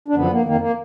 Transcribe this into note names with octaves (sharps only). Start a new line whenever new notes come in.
D4
F#2 D3 F3 B3
A#3
F2 D#3 A#3
A#3